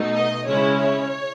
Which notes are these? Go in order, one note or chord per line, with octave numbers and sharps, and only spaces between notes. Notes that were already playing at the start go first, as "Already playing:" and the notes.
Already playing: B2 A3 D#4
D#5
C#3 G#3 C#4 E4 C#5
C#5